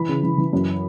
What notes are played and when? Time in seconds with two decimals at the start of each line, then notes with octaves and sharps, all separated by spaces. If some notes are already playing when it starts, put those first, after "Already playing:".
Already playing: E3 B5
0.09 C#3
0.23 E3
0.38 E3
0.53 F#2